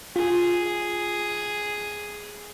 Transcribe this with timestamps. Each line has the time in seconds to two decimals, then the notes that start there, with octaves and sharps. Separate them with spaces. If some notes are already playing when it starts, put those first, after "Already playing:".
0.16 F4 G#4